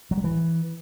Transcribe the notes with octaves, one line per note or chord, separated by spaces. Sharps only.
F#3
G3
E3